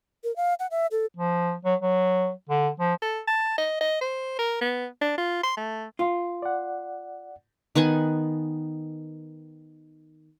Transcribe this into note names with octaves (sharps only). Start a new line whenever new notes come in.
A#4
F5
F#5
E5
A4
F3
F#3
F#3
D3
F3
A4
A5
D#5
D#5
C5
A#4
B3
D4
F4
C6
A3
F4
D5 F#5
D#3 B3 F#5 G#5